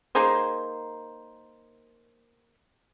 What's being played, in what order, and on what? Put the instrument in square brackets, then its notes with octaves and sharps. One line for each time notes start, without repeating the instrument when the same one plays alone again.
[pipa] A#3 D#4 G#4 C5